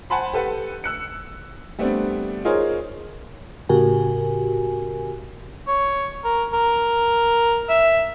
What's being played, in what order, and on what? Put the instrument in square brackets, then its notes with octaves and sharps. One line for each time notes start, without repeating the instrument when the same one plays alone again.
[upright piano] C5 F#5 G#5 A5 B5 C6
G4 A4 B4 F#5
E6 F#6 C#7
G3 A3 B3 C4 D4
D#4 F4 G#4 A#4 C5 C#5
[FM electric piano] A2 C#3 F#4 G4 A#4 G#5
[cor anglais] C#5
A#4
A#4
E5